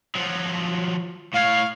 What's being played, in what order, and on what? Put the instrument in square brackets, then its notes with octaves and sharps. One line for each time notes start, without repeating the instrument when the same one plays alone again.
[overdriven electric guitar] F3 F#3
[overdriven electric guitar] A2 C#5 [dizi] F5